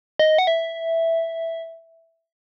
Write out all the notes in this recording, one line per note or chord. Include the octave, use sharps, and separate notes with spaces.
D#5
F#5
E5